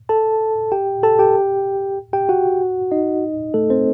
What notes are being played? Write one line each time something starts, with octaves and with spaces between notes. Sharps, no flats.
A4 A5
G4 G5
A4 A5
G4 G5
G4 G5
F#4 F#5
D#4 D#5
A3 A4
C4 C5